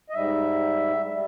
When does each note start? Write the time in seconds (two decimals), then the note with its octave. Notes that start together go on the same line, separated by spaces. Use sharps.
0.10 D#5
0.14 G#2 G3 E5
1.12 G3